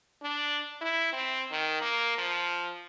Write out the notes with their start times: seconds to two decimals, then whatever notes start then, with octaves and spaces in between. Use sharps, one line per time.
0.22 D4
0.81 E4
1.13 C4
1.51 D#3
1.81 A#3
2.18 F3